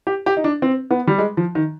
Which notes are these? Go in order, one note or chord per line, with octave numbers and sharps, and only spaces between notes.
G4
G4
D#4
D4
C4
B3
G3
G#3
F3
D#3